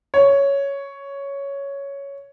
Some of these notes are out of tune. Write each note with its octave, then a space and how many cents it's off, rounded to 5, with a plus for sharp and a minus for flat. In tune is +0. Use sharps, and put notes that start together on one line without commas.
C#5 +5